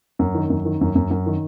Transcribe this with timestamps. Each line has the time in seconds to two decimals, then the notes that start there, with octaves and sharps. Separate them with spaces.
0.19 F#2
0.34 D#3
0.50 F#2
0.65 D#3
0.81 F#2
0.95 F#2
1.11 F#2
1.26 D#3